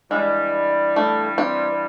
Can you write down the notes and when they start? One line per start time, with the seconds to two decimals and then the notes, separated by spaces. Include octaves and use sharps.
0.10 G2 E3 G3 G#3
0.96 A3
1.38 C4